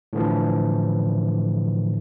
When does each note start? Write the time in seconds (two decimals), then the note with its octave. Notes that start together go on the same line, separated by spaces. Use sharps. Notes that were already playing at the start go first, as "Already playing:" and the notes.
0.13 A2 D3 E3 F3